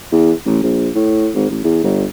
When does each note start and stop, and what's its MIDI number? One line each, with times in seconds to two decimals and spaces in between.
0.12 0.32 40
0.46 0.59 33
0.63 0.89 34
0.95 1.29 45
1.35 1.50 32
1.50 1.64 33
1.64 1.79 40
1.83 2.05 31